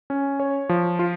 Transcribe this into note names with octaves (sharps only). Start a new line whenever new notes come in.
C#4
C#5
F3
F4